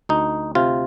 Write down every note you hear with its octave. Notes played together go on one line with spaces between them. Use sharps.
D2 D#4
C3 F4